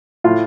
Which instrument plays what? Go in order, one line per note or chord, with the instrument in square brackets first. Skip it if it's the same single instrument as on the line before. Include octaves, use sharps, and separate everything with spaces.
[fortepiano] A2 F4